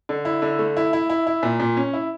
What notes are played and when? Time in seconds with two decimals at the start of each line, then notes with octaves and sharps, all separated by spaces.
0.09 D3
0.25 E4
0.42 D3
0.59 A3
0.77 E4
0.93 E4
1.09 E4
1.27 E4
1.43 A#2
1.60 A#2
1.77 C#4
1.93 E4